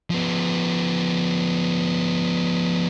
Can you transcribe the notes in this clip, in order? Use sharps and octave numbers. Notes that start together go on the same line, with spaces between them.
F3 B3